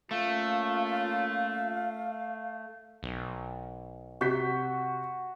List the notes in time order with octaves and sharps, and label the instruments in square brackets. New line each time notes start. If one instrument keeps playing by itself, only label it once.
[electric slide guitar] A3 [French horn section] A#3 C#4 F4 [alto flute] F5
[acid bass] B1
[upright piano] C3 G6 B6 [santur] F#4